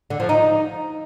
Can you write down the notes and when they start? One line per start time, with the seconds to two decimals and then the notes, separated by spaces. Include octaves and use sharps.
0.10 D3
0.20 F3
0.29 D#4